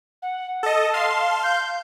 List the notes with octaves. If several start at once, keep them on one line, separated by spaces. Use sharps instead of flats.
F#5
A4 D#5 A5
F5 C6
G6